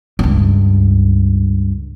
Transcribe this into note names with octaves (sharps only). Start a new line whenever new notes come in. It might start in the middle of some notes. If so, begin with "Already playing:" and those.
C#2 G2